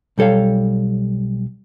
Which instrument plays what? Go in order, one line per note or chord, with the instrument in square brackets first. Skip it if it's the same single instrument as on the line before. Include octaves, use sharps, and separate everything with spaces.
[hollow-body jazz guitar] B1 G3 A4 C#5 F5